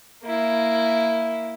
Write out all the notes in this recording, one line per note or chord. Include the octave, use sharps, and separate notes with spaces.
A#3 E4